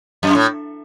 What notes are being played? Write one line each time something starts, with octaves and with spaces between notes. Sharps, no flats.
F#2
A2